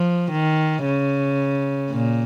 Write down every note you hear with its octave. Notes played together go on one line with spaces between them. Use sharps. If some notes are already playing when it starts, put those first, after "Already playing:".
Already playing: F3
D#3
C#3
A#2